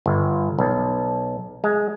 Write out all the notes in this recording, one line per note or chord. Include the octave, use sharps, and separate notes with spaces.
G1
B1
G#3